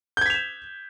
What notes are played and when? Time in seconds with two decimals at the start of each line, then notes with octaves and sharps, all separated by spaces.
0.17 G6
0.21 G#6
0.26 B6
0.30 F7
0.34 E7